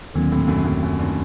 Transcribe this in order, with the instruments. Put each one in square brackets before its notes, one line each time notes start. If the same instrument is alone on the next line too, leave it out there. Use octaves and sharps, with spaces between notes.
[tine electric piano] D#2 D#3 F#3 C4 [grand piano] A#2 D3
[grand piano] A2 C3
F#2 A2
F#2 A2
F#2
G2